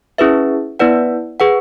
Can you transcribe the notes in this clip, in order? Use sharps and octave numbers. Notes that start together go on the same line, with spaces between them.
C#4 E4 G#4 B4 E5
B3 E4 B4 D5 F#5
G#4 B4 F#5